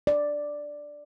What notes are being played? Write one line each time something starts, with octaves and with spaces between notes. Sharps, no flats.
D5